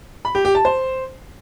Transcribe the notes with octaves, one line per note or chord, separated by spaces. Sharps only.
B5
G4
G4
A5
C5